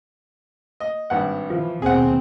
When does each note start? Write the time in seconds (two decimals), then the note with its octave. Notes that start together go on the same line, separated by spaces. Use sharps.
0.80 D#5
1.10 G#1 G2 F#5
1.50 E3 F3
1.82 D#2 B2 C4 G#4 F#5